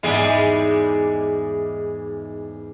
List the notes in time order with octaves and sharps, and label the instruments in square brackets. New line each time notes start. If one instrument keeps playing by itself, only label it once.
[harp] E2 G#2 [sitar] G3 G#3 G#4